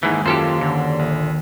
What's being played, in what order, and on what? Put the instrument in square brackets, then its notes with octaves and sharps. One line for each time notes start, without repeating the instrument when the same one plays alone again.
[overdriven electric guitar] D#2 [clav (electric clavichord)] G#2 E3
[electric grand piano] F#2 [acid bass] F4 [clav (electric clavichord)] G4 A4 C5
[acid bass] D3
[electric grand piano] A#1